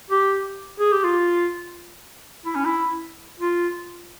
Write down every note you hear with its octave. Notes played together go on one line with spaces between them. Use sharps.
G4
G#4
G4
F4
E4
C#4
E4
F4